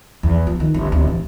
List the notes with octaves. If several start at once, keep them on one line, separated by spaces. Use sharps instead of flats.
E2
F3
D#3
G1
D1
E3